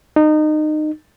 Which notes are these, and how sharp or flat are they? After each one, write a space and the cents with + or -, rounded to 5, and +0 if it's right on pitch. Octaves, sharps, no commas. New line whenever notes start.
D#4 -25